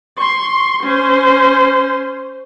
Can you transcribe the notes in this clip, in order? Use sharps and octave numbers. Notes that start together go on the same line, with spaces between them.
C6 C#6
C#4 C5